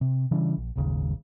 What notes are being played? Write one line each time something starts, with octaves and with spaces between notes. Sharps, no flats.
C3
C#3 E3 G3 D4
A#1
D#1 G#1 D#2 C#3